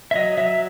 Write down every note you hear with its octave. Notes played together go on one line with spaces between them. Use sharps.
E5
F#3 D#5
F#3 E5